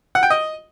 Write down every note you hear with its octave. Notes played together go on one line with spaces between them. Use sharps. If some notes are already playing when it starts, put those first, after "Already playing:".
F#5
G5
D#5